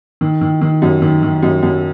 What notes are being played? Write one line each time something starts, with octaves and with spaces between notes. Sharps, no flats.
D#3
D#3
D#3
F#2
D#3
D#3
F#2
F#2